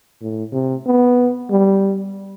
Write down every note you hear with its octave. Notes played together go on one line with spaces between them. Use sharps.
A2
C3
B3
G3